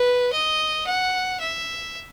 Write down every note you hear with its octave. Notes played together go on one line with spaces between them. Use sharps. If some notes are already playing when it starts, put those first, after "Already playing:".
Already playing: B4
D#5
F#5
E5